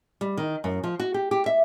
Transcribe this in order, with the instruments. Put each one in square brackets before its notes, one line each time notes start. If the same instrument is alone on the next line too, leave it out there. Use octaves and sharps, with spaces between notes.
[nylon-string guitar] G3
D#3
F#2
F3
F#4
G4
G4
E5